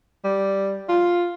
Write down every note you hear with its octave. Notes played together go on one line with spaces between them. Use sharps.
G3
F4